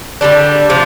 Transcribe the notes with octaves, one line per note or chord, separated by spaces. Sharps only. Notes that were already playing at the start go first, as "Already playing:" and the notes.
D3 G3 D4
C3 F3 D4